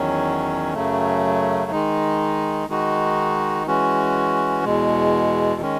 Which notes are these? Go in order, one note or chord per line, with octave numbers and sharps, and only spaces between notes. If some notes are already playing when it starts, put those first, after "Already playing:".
Already playing: E2 D#3 F#3 C#4
F#2 C#3 F#3 A3
D#3 G#3 D#4
D#3 G#3 D#4 F#4
E3 G#3 C#4 F#4
E2 B2 G#3
D#3 G#3 C#4